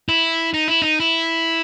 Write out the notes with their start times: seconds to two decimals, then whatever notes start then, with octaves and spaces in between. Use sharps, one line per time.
0.09 E4
0.54 D#4
0.68 E4
0.82 D#4
1.00 E4